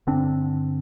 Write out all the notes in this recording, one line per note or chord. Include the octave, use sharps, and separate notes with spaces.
G2 D3 C4 D4